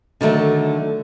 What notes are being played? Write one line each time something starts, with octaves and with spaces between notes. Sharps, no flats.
D3 D#3 F#3 A3